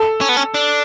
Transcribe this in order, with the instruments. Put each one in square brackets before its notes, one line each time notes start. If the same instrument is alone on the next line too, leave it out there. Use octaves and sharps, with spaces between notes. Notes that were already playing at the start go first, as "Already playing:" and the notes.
Already playing: [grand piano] A4
[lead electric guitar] C#4
B3
C#4
D4